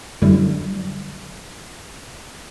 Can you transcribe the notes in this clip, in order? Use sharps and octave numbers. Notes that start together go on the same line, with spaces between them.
F#2 D3 F#3 G3 E4